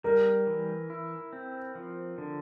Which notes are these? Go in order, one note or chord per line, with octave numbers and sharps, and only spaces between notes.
G3 A#4
E3
E4
C4
F3
D3